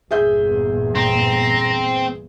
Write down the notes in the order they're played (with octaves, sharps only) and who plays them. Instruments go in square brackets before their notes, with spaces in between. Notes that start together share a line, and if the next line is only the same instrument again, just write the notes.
[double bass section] G1 E2 A#2 [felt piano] G#4 E5 G6
[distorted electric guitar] C4 [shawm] A#5